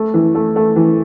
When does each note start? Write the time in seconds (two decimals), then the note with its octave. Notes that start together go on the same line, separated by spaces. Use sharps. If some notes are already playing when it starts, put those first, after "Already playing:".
Already playing: A3
0.14 E3
0.35 A3
0.56 A3
0.76 E3